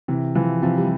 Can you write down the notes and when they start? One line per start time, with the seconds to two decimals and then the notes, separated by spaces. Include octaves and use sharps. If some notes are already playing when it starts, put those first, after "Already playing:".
0.08 C3 E3
0.35 E3 F3
0.62 C3 F3
0.78 G3